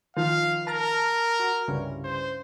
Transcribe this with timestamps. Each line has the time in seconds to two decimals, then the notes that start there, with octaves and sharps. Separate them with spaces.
0.17 D#3 F3 F5
0.67 A#4 A5 A#5 F6
1.40 F#4
1.68 C2 G2 C#3
2.05 C5